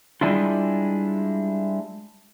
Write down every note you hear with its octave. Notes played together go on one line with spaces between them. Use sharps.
G3 G#3 D4 E4 F4